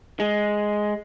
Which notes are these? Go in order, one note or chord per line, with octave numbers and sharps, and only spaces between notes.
G#3